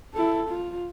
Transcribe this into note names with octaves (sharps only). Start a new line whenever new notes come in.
E4 A4
F4